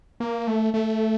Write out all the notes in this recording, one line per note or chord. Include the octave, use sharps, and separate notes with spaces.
A#3
A3
A3